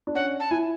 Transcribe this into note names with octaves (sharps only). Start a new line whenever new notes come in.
D4
C#4 F#5
A5
E4 G#5